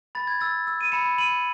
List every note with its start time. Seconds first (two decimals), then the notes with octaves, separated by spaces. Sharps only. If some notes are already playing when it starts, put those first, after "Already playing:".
0.15 B5 A6
0.27 G#6
0.41 E6 A6
0.67 E6
0.81 D#7
0.92 B5 C#7 E7
1.18 B5 D#7 F#7